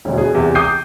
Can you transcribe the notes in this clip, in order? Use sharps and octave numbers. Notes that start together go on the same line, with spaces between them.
E1 D2
B2 G#4
E2 C3
D6 D#6 G6 C7